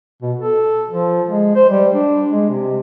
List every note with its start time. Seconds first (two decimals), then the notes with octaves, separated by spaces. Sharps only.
0.22 B2
0.39 A4
0.90 F3
1.28 G#3
1.55 C5
1.69 G3
1.94 D4
2.31 G#3
2.49 C3